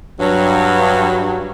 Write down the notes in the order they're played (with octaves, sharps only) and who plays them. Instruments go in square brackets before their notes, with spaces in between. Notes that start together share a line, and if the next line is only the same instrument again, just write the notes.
[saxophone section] G2 F#3